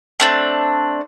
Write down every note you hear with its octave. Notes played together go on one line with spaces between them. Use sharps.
A3 C4 D4